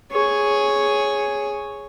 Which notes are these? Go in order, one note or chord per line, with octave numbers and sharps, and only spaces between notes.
G#4 C#5